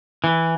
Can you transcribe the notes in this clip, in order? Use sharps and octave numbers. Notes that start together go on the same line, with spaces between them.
E3